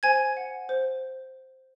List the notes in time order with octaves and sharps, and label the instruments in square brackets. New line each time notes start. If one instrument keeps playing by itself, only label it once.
[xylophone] C5 G#5 G#6
F#5
C5